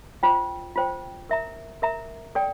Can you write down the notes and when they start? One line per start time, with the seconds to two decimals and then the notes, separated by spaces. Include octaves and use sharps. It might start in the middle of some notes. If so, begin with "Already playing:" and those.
0.23 F4 C5 G5
0.76 F4 C5 G5
1.29 A#4 E5 A#5
1.82 A#4 E5 A#5
2.35 A4 D5 G5